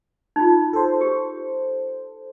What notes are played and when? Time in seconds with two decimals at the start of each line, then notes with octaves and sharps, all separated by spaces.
0.36 D#4 F4
0.73 A4 C5
1.01 G4